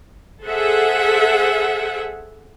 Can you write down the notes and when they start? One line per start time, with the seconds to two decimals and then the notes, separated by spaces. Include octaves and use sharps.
0.44 G#4 A4 C5 E5 F#5